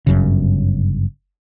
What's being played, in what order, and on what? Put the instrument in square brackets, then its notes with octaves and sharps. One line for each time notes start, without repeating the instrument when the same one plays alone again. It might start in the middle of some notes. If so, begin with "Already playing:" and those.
[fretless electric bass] G1 F#2 C#3